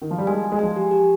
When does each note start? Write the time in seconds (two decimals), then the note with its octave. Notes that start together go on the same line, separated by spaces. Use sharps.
0.02 D#3
0.11 F3
0.18 G3
0.27 G#3 G#5
0.44 G#5
0.52 G#3
0.59 F3 G#5
0.76 G4
0.91 G4